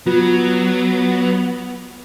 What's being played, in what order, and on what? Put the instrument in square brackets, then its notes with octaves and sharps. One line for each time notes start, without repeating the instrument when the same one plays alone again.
[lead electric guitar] F#3 [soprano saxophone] B3 [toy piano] F4